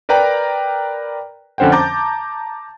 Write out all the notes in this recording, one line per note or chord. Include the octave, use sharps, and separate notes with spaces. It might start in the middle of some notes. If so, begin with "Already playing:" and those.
A#4 B4 D5 G5 A#5
F2 D3 C#4 C5 F#5 G5
A5 A#5 D6 G6 A6